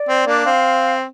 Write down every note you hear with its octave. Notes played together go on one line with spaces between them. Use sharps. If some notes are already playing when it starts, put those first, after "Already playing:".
Already playing: D5
C4
A#3 D4
C4 F5